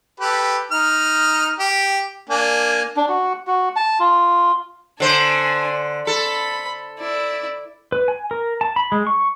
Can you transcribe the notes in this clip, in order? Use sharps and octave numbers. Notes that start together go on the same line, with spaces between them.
G4 A4 B4
D#4 F6
G4
A#3 D4 G#5
D4
F#4
F#4
A5
F4
D3 D4 C5 G#5
A4 B5
E4 D5
B4
G#5
A#4
A5
B5
G#3
C#6